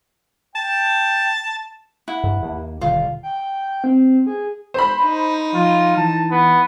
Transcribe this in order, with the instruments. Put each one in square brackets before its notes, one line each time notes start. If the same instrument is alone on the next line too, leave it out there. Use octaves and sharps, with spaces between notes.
[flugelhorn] G5 [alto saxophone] A5
[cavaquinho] E4 F#5
[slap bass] G2
D#2 A#3
[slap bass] D#1 G3 [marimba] B2 D3 D#3 [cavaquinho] F4
[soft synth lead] G5
C4
G#4
[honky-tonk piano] C5 B5
[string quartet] D#4
[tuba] F3 [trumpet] F4
[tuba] E3 [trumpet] A5
[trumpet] B3